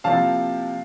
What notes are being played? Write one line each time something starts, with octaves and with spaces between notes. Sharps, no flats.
C3 F3 A#3 E4 F5 A5